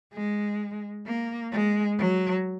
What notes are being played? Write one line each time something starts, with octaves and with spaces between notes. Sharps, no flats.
G#3
A#3
G#3
F#3